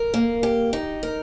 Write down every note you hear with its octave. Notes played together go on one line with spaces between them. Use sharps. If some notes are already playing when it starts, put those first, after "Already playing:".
Already playing: A#4
A#3
G4
D#4
A#4